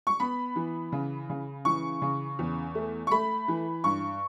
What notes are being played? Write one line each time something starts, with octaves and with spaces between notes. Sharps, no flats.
C#6
B3 B5
E3
C#3
C#3
E3 C#6
C#3
E2
A3
C#6
A3 B5
E3
G2 C#6